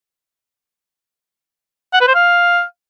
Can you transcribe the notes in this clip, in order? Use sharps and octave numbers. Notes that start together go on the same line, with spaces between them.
F#5
B4
C5
F5